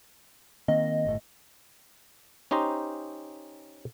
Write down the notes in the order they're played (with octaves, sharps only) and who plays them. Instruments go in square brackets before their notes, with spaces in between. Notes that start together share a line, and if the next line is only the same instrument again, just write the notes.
[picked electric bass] D#3 A#3 C4 [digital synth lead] D#5
[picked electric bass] G1 A2
[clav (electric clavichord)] C#4 D#4 G4 C5 A#5